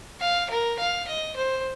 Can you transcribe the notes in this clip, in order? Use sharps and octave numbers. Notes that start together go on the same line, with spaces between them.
F5
A#4
F5
D#5
C5